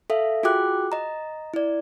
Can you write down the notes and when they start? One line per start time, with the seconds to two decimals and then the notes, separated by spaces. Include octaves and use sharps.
0.10 A4 E5 F5
0.43 F4 F#4 G#4 G5 D6 F#6
0.92 D#5 A#5
1.54 E4 D5